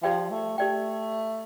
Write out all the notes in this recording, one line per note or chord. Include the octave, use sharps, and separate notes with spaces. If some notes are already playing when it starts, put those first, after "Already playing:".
F3 G4 D5 G5
A3
A3 G4 D5 G5